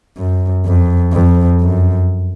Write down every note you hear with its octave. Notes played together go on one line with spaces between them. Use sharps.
F#2
F2
F2
F#2